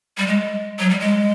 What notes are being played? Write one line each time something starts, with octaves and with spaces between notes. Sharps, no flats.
G3
G#3
F#3
G3
G#3